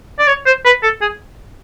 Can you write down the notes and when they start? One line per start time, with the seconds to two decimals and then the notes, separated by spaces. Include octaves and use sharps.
0.19 D5
0.27 C#5
0.46 C5
0.65 B4
0.83 A4
1.02 G#4